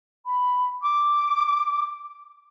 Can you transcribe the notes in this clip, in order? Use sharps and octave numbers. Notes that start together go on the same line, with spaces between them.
B5
D6